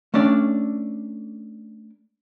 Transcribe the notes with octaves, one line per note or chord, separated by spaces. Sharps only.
A3 C#4 D4 D5